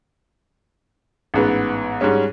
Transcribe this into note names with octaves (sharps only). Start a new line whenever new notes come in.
A1 G#2 B3
G#2 G3 G#3 C#4